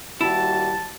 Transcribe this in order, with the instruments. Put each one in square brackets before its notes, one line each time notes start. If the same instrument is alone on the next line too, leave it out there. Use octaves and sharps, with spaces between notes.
[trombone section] D#2 G3 F#4 [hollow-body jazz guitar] E4 [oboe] A5